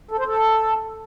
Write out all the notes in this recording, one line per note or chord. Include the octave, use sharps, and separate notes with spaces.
A4
C5
A4